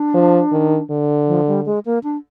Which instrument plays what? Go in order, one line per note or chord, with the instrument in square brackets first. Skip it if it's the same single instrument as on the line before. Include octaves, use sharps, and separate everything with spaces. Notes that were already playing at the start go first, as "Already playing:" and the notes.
Already playing: [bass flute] D4
[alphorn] F3
D#3
D3
[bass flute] F3
G3
G#3
A#3
D4